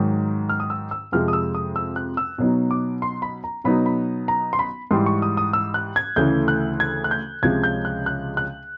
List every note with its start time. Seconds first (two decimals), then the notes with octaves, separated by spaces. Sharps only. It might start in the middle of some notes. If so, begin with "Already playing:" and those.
Already playing: G#2 D#3 F#3
0.49 F6
0.60 D#6
0.70 E6
0.91 E6
1.12 F2 C3 F3 G#3 F6
1.28 D#6
1.33 E6
1.55 D#6
1.76 E6
1.96 F#6
2.17 E6
2.38 B2 F#3 B3 D#4
2.71 D6
3.02 C6
3.22 B5
3.44 A#5
3.64 B2 F#3 B3 D#4 B5
3.86 B5
4.28 A#5
4.53 C6
4.59 B5
4.91 G#2 E3 G3 C6
5.06 C#6
5.22 D#6
5.37 D#6
5.53 E6
5.74 F#6
5.96 G#6
6.16 D2 C#3 E3 A3 G6
6.48 F#6
6.80 G#6
7.04 F#6
7.11 G6
7.43 C#2 C3 F3 G#3 G#6
7.63 G6
7.85 F#6
8.06 F#6
8.37 F#6